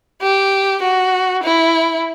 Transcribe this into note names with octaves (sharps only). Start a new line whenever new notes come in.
G4
F#4
E4